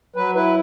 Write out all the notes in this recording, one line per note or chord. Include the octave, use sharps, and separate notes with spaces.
F#3 B4
E4 B4